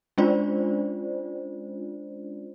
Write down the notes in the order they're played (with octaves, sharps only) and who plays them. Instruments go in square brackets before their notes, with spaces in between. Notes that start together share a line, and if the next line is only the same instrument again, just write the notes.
[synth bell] G#3 C#4 D4 F4 C5 D5